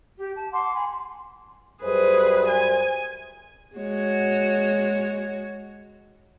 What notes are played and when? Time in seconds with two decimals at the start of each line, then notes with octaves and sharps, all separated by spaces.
0.18 G4
0.36 A5
0.52 F#5 A5 C6 D6
0.74 F#5 G#5 B5 C6
1.83 F#2 G3 G#4 B4 C5
2.48 G#5
3.76 G#3 F#4 C#5